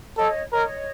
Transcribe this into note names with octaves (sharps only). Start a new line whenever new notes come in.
A4 C#5 D#5
A#4 C#5 D#5